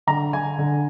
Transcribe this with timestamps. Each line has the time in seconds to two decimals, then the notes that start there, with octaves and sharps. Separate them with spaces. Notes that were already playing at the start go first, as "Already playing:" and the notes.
0.07 D3 A#5
0.33 D3 G#5
0.58 D3